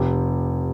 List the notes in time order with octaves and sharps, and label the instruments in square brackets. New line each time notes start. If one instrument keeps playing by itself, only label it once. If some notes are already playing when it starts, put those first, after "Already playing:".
Already playing: [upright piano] F1 G4